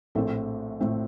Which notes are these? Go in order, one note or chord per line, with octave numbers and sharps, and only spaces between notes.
A#1 A2 A3 C4 A4
A2 A3 C4